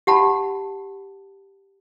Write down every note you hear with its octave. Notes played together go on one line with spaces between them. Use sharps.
G4 F#5 A5 B5